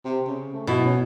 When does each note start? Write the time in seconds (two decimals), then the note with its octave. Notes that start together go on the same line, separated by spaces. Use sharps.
0.05 C3
0.27 C#3
0.53 A3
0.67 B2 E4
0.85 C#4